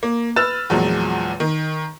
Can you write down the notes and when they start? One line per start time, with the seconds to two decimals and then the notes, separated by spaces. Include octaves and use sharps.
0.03 A#3
0.36 B4 E6 F6 A6 E7
0.70 E2 A#2 F3 F#3 G#3
1.40 D#3